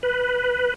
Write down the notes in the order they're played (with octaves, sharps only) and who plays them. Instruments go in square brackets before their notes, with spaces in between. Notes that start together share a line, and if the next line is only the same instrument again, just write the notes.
[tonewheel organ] B4